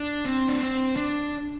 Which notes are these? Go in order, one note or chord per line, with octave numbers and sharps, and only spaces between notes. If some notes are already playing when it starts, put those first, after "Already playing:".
Already playing: D4
C4
D4
C4
D4